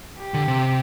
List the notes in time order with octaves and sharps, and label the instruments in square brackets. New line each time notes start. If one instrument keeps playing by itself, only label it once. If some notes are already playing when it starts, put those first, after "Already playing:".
[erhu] G4
[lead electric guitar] D3
C3